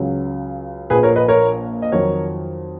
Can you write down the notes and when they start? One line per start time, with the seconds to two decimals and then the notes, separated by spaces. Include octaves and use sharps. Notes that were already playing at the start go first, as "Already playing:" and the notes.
Already playing: C#2 C#3 F#3
0.90 A#1 A#2 F3 G#4 B4
1.03 A#4 C#5
1.16 B4 D#5
1.28 A#4 C#5
1.82 D#5
1.92 F2 D#3 F#3 A#4 C#5